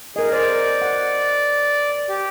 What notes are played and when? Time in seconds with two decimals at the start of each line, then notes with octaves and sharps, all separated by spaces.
0.16 G#4 A#4 D#5
0.32 C5 D5
0.82 F#5
2.09 G4